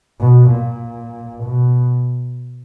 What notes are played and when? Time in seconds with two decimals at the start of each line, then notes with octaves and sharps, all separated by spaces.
0.20 B2
0.51 A#2
1.44 B2